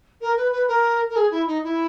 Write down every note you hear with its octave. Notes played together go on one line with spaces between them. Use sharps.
A#4
B4
B4
A#4
A#4
G#4
E4
D#4
E4